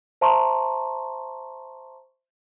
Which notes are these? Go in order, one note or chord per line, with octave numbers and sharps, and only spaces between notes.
C5 E5 A5 A#5 C6 C#6